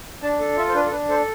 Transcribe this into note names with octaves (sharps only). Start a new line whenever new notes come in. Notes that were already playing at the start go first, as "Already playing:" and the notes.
D4 A5
A4
F4 E5
C5
D4 B4
A4
D4 B4
A4 C5